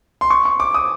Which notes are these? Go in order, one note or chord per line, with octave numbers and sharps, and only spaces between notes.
C6
C#6
C#6
D6
D#6